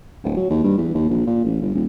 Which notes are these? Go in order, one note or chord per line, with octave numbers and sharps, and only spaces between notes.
D1
F#3
D#2
G2
E2
D#2
A#1
A#2
A1
G1
D#1